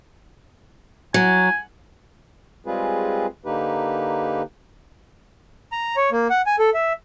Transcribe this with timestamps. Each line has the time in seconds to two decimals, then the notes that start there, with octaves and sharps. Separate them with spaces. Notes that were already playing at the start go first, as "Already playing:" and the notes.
1.14 F#3 G#5
2.66 G3 G#3 C4 F4 G#4 B4
3.45 D3 A#3 D#4 G4 B4
5.72 A#5
5.96 C#5
6.12 A#3
6.30 F#5
6.46 G#5
6.59 A4
6.74 E5